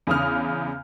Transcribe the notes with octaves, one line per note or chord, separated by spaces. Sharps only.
E2 C#3 D#6 F6